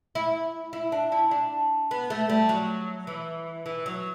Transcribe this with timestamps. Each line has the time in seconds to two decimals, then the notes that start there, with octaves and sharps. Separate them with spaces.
0.15 E4
0.73 E4
0.92 D4
1.12 E4
1.31 D4
1.91 B3
2.10 A3
2.29 G3
2.49 F#3
3.07 E3
3.66 E3
3.86 F#3